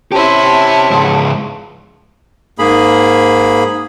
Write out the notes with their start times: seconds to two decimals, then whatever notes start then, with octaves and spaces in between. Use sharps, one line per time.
0.12 C#4 E4 G4 C5 A5
0.91 C#2 G#2
2.59 G#2 A#3 G#4 B5